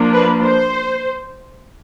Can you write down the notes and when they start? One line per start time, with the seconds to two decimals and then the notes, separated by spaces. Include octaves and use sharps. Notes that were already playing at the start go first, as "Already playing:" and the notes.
Already playing: F3 A#3 D4
0.12 B4
0.41 C5